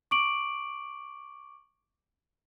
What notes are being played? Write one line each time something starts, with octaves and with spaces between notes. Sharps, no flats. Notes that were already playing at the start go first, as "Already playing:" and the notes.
C#6 D6 D7 F#7